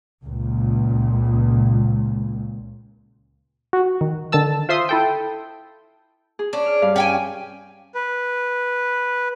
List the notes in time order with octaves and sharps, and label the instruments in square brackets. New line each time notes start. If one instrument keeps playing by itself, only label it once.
[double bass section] C#2 A#2
[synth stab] F#4
D#3
D3 D#3 A5 E6
F4 C5 E5 C6 D#6
E4 A4 G5
[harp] G#4
[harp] C#4 [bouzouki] D4
[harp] F6
G2 F5
[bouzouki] C#4 G5 G#5
[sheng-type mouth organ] B4